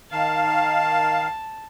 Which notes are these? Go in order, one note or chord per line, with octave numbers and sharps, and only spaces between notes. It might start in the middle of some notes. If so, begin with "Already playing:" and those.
D#3 F5 A5